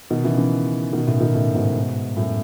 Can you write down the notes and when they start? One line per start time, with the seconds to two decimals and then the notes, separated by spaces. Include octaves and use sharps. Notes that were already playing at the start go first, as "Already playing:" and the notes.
0.11 B2 D#3
0.24 C#3 E3
0.38 C#3 E3
0.93 B2 D#3
1.07 A2 C#3
1.20 B2 D#3
1.34 A2 C#3
1.55 G#2 B2
2.17 F#2 A2